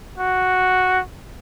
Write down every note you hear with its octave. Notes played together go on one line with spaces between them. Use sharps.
F#4